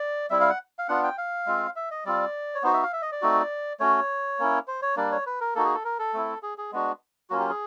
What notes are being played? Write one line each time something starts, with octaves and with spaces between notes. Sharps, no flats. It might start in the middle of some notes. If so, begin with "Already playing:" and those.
Already playing: D5
G3 C4 E4 E5
F5
F#5
F5
B3 D4 F4 F#5
G5
F5
G#3 C4 F4
E5
D#5
G3 C4 F4 D5
C#5
B3 D#4 F#4 C5
E5
F5
E5
D#5
D5
A3 C4 D#4 F#4
A3 C#4 F#4 C#5
A#3 C#4 E4
C5
C#5
G3 A#3 D4 D5
C#5
B4
A#4
A#3 D#4 F#4 A4
G#4
A4
A#4
A4
A3 C4 E4
G#4
G#4
G#3 B3 D4 F#4
F#3 A#3 C#4 F4 F#4
G4
G#4